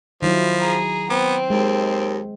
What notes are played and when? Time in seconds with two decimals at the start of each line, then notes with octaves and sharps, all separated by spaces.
0.22 D#3 F3 F#3 E4
0.60 G#4 A#5
1.10 B3 C4
1.50 D#2 G#3